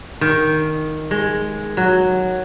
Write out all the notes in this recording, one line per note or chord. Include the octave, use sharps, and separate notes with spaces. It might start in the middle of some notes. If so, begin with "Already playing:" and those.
D#3
G#3
F#3